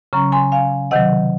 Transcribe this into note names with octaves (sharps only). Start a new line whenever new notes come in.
C#3 F#3 C#4 A#5 C#6
G#5 C6
F5 G#5
C3 D#3 F#3 D#5 F#5